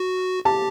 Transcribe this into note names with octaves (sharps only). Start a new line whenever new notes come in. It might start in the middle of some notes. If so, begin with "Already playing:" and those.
Already playing: F#4
G4 A5